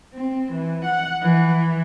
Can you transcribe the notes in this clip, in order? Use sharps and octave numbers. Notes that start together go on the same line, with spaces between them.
C4
E3
F#5
E3